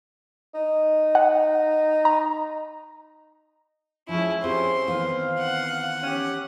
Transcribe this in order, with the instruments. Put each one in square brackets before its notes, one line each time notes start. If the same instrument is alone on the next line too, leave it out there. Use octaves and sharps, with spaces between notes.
[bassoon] D#4
[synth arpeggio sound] F#5
A#5
[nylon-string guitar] F3 G#3 [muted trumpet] C#4 [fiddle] E4
[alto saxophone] C4 [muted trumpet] C#4 [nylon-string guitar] F4 G4 G#4 [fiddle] C6
[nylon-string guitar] D#3 E3 B3 [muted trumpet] F5
[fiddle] F#5
[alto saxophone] C#4 [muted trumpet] G4